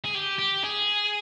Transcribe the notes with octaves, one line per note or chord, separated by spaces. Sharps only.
G#4
G4
G4
G#4